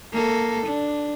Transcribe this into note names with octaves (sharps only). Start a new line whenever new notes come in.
A#3 A4
D4